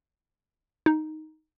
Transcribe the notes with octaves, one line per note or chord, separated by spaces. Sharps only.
D#4